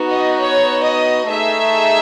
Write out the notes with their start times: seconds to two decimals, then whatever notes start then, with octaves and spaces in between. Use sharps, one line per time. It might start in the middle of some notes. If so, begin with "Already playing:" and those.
Already playing: B3 D#4 F#4
0.10 D#5
0.40 C#5
0.85 D#5
1.30 A3 D#4 G#4 E5